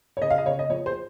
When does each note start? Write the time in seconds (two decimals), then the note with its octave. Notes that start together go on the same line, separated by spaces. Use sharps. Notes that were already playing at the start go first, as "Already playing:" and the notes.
0.17 C#5
0.22 C#3 D#5
0.30 F5
0.38 D#5
0.46 C#3 C#5
0.59 D#5
0.69 F3 C#5
0.86 C5